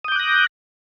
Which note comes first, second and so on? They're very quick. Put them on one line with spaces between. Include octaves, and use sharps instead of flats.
D#6 G6 D6 F#6 A#6